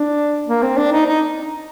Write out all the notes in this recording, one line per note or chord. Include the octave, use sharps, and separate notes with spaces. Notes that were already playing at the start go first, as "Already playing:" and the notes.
Already playing: D4
A#3
C4
D4
D#4
D#4